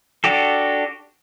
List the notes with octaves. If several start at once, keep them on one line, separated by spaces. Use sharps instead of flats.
D4 F#4 G4 A4